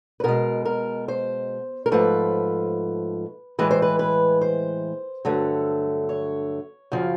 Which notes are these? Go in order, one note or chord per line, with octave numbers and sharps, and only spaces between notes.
B4
B2 G#3 A#4
A#4
C5
A#4
G#2 F3 A3 B4
A2 E3 G#3 B4
C5
B4
B4
C5
G2 D3 F#3 A3
C#5
F#2 C#3 F3